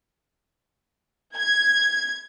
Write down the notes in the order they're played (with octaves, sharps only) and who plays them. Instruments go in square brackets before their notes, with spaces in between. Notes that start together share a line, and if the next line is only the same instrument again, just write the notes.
[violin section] G#6